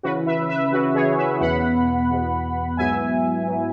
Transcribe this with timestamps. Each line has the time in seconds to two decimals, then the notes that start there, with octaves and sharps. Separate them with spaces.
0.03 C#3 E3 C#4 E4 F#4 B4
0.27 B4 E5
0.49 B4 E5
0.72 C#3 E3 C#4 E4 F#4 B4
0.95 G#4 C#5
1.17 B4 E5
1.40 E2 B2 B3 F#5 B5
2.09 E2 B2 B3
2.77 G#2 F#3 B3 E4 E5 G#5
3.46 F#3 B3 E4